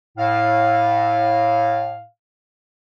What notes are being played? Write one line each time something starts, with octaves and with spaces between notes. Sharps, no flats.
A2 F5